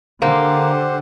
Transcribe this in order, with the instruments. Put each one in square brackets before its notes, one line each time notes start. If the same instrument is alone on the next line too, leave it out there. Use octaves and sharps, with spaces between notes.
[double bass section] D3 [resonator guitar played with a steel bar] A#3 [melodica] G4 F#5 [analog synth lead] C5